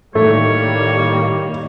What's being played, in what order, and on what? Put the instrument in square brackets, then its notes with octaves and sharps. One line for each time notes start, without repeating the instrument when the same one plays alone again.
[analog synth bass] A2 [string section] D#3 G3 A#3 [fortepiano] A3 [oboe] C#5